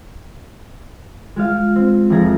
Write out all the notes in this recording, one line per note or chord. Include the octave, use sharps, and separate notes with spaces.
G#3 F4 F5
C4
F1 F3 G#4 A#5